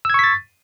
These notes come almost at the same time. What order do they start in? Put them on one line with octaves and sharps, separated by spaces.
E6 G#6 C#6 B6 A6